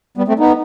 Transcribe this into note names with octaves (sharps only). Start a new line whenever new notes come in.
G3 B3
A3 C4
B3 D#4